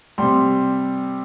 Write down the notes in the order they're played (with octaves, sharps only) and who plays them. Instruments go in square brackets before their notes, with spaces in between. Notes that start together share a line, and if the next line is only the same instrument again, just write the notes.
[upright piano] C3 G3 C6